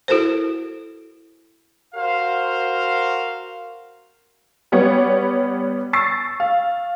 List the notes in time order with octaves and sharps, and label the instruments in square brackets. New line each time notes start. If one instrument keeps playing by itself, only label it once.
[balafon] E4 F#4 A4 A#4 C5
[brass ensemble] F#4 A#4 C5 F5
[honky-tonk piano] G3 B3 C#5
C#6 E6 A6 C7
F5